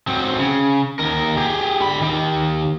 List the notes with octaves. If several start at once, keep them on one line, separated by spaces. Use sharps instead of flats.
F#3 C4
C#3
D#2 A#4
G4 G#4
D3 B5
D#3 G4